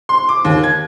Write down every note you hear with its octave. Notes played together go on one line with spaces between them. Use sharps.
C6
D6
D#2
G#6